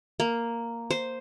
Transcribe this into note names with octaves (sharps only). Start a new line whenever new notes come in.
A#3
C5